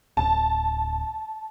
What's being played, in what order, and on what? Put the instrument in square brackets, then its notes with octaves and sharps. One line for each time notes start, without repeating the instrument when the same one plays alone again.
[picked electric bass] D1 [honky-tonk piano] A5